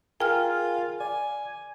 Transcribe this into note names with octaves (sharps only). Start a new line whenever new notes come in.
F4 G#4 A#4 G5 G#5 F6
D5 G#5